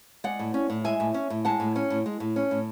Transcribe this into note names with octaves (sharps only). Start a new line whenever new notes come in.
G#3 D5 F#5
A2
C#4
A2
G#3 E5 G#5
A2
C#4
A2
G#3 F#5 A5
A2
C#4
A2
G#3
A2
C#4
A2